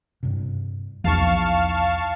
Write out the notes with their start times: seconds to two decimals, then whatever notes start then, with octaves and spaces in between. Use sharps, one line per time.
0.23 G2 C3
1.04 B1 E2 F3 D#4 F5 A5 C#6